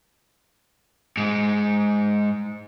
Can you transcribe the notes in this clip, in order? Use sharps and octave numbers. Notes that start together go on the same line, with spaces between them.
G#2 G#3